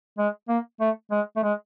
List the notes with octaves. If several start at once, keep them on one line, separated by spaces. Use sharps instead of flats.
G#3
A#3
A3
G#3
A3
G#3